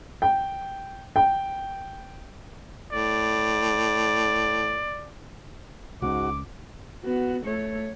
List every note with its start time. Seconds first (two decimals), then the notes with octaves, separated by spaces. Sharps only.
0.22 G5
1.16 G5
2.92 A2 D5
6.02 C#2 G#2 C#3 F#4 D6
7.05 B3 F#4
7.45 A3 C#5